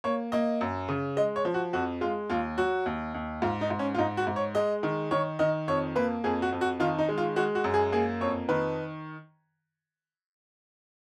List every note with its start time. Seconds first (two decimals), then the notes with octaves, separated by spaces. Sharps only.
0.04 A#3 C#5
0.32 A#3 D#5
0.61 F#2
0.89 C#3
1.17 G#3 D#5
1.36 C#5
1.45 F3
1.54 F#4
1.73 F2 F#4
2.01 G#3 F4
2.30 D#2 F4
2.58 F#3 F#4
2.86 D#2
3.14 D#2
3.42 G#2 F4
3.61 D#4
3.70 G#2
3.79 C#4
3.94 F4
3.99 G#2 D#4
4.17 F#4
4.27 G#2
4.36 C#5
4.55 G#3 D#5
4.83 D#3
5.11 D#3 C#5
5.39 D#3 D#5
5.68 F2 C#5
5.96 A#3 B4
6.24 F2 G#4
6.42 F#4
6.52 F2
6.61 F#4
6.80 D#3 F4
6.98 D#4
7.09 G#3
7.18 F4
7.36 G#3 F#4
7.55 F#4
7.64 F#2
7.74 G#4
7.92 A#3 G#4
8.21 F2 C#5
8.49 D#3 B4